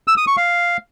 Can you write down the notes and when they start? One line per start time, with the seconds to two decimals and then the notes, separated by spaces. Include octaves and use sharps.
0.08 E6
0.17 D#6
0.27 C#6
0.37 F5